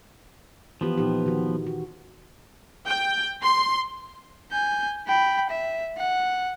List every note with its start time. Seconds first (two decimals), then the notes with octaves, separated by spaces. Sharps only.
0.81 E3 F3 B3 F4 G4
0.98 A#2 D#4 G4
1.26 D#3 F#4
1.67 F#4
2.87 G5
3.42 C6
4.52 G#5 G6
5.08 G5 B5
5.50 E5
5.97 F#5